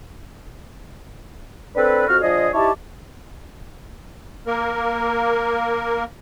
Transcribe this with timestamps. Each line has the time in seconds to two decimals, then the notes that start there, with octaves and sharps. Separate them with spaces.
1.76 C4 D4 A4 B4
2.08 F2 F#4 F6
2.22 F3 D4 F4 G#4 D#5
2.54 D#4 E4 G4 C#5 D5 A5
4.47 A#3 A#4